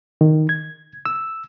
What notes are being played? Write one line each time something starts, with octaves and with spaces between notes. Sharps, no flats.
D#3
G#6
E6